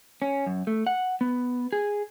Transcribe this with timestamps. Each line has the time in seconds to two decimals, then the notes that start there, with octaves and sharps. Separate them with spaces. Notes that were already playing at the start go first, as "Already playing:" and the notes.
0.22 C#4
0.47 F#2
0.67 A3
0.87 F#5
1.21 B3
1.73 G#4